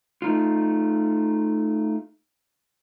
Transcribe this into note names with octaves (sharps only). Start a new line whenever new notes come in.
A3 D#4 F4